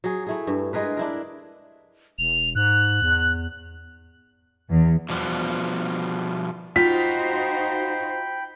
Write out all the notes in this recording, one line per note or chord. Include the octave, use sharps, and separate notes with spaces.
F#3 G#4
A3 E4 G#4
G2
G#3 G#4 A#4 B4
D4 E4 A#4
E1 F7
G#2 F#6
E2
E2
B2 F3 G3 B3
D#4 F4 F#4 C5 G5 B5 B6